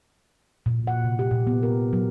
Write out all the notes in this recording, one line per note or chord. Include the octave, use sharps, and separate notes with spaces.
A#2
F#5
C3
G4
A#2
B3
A#4
F#3